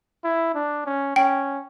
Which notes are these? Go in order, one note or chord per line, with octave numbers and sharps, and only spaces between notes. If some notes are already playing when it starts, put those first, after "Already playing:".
E4
D4
C#4
C#4 G5